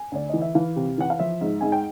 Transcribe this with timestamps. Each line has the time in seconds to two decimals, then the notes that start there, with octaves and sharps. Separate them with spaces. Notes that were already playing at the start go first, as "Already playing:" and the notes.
Already playing: G#5
0.12 D2 D5
0.29 E3 D#5
0.41 E5
0.55 E3 F5
0.76 C3
0.98 E3 F#5
1.10 F5
1.19 F3 E5
1.41 G#2
1.61 G#2 G#5
1.72 G5